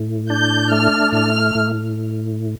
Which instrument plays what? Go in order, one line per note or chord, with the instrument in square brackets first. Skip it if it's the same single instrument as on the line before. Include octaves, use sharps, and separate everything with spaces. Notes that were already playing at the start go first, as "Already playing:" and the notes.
Already playing: [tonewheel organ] A2
[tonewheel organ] D4 [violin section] G6
[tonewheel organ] A3 [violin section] F6
[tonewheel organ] A2 [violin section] F6
[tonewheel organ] A2